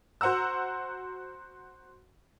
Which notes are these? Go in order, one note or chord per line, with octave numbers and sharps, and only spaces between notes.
F#4 C5 F#5 A#5 E6